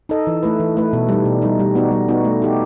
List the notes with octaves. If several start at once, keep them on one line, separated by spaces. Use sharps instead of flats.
D#4 A4 D#5
E3
A3 E4 B4
E3
A3 E4 B4
B2
G3 D#4
B2
G3 D#4
G3
B3 D#4 F#4
G3
B3 D#4 F#4
A3
D#4 G4